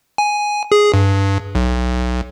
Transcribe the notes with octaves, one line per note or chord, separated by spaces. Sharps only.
G#5
G#4
G2
B1